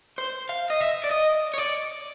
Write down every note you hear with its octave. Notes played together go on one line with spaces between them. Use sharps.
C5
F5
D#5
E5
D5
D#5
C#5
D5